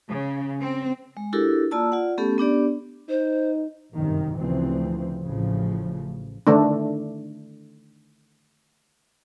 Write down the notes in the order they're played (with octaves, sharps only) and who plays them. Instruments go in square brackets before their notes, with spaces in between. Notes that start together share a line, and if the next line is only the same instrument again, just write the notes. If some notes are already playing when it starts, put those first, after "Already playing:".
[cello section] C#3
C4
[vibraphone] G#3
D4 E4 F#4 G4 A4 A#4
A#3 F4 D5 A5 E6
F4 D5 F#5
A3 B3 C#4 G4 A4
B3 D4 G4 D5
[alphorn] D#4 [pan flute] C5
[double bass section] G1 F#2 C3 D#3
D2 A#2 C#3 E3 F3 C4
A1 A2 C#3 F3
[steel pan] D3 D#3 A3 D4